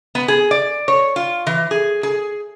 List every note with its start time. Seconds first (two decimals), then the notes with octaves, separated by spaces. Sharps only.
0.15 B3
0.28 G#4
0.51 D5
0.88 C#5
1.16 F4
1.47 E3
1.71 G#4
2.03 G#4